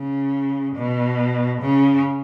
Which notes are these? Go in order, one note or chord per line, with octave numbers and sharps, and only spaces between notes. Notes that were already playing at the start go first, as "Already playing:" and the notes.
Already playing: C#3
B2
C#3